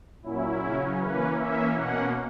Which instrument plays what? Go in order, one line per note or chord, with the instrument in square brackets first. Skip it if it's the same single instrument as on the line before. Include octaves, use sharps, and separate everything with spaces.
[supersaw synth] A#2 F#3 C#4 E4
C#3 F#3 C#4
E3 A#3 C#4 B4
E3 A#3 C#4 E5
B2 A#3 C#4 F#5